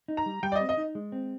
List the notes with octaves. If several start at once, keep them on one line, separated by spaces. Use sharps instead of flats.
D#4
A#5
G3
G3 G5
D5
D#5
C4
D#5
D#4
G#3
C4